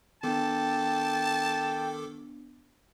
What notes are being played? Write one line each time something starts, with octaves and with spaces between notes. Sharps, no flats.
D#3 B3 D4 A4 G5 A5 D6